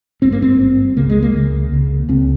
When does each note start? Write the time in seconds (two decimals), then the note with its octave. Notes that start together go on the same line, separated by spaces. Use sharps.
0.22 G#1 G2 C4
0.32 A#3
0.42 C4
0.59 G#1 G2
0.97 C#2 C#3 A#3
1.10 G#3
1.22 A#3
1.34 C#2 C#3
1.72 C#2 C#3
2.09 C#2 C#3 C4